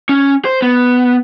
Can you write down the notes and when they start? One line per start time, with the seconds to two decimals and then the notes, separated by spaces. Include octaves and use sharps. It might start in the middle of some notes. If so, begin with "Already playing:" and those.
0.09 C#4
0.45 C5
0.62 B3